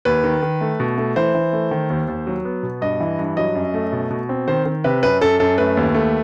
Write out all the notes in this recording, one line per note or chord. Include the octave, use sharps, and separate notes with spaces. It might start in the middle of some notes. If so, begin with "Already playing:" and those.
D#2 B4
D#3
D#3
A3
B2
A3
E3 C5
E3
A3
D#3
D#2
D#2
F#3
B3
B2
G2 D#5
E3
G2
F#3 D#5
F#2
A3
B2
B2
C4
D#3 C5
D#3
C3 B4
F#2 B4
F#2 A4
F#2 A4
A3 B4
D#2
A3